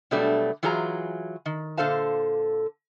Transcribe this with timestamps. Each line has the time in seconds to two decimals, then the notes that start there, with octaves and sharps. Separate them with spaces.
0.11 B2 F#3 G3 A3 D4 D5
0.63 E3 F#3 F4 G#4 F#5 A#5
1.46 D#3
1.77 A#2 D3 A4 C5 F5 A5